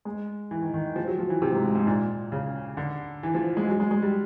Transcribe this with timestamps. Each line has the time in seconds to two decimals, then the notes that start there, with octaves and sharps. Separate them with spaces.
0.05 G#3
0.51 E3
0.62 D#3
0.74 D#3
0.96 F3
1.08 F#3
1.19 F3
1.30 E3
1.42 C3
1.53 G#2
1.64 G#2
1.75 G#2
1.87 A#2
2.32 C#3
2.77 D3
3.23 E3
3.34 F3
3.57 G#3
3.68 F#3
3.80 G#3
3.91 G#3
4.02 G3